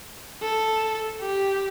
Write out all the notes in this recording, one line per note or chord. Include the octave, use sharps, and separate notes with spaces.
A4
G4